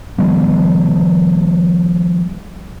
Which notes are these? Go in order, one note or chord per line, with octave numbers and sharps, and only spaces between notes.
D#3 F3 G3 B3